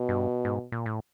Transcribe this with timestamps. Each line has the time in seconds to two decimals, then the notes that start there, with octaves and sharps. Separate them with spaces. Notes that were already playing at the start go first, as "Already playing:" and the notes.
Already playing: B2
0.09 G2
0.45 G#2
0.72 A#2
0.86 A2